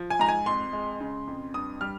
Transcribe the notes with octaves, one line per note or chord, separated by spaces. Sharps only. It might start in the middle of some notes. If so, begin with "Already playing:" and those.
Already playing: F3
G#5
G#2 A#5
G#5
F2 C6
G#3
C#3
F2
G2 D#6
G3 F6